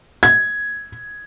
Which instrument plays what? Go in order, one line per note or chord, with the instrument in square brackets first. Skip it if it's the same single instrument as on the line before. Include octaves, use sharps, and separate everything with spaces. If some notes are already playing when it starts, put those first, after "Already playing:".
[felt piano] G#6